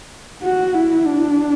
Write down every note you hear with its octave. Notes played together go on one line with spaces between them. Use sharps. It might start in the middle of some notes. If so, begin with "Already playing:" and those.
F#4
E4
D4